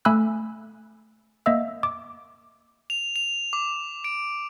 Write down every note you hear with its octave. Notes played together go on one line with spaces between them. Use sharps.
A3 G#5 B5 E6 F#6
A#3 D#5 E5 E6
D6
F7
F7
D6
D7